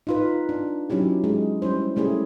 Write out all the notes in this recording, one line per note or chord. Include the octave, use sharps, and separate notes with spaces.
D#4 F4 B4
D4
F#3 C#4 D#4 E4 G4
G#3
G3 C#4 E4 C5
G3 A3 C#4 E4 G#4